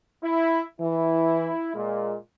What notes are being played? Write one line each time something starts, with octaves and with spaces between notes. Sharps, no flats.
E4
E3 E4
A#2 G#3